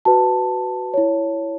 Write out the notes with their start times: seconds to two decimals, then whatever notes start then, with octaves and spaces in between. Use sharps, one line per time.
0.05 F#4 B4 A5
0.94 E4 C#5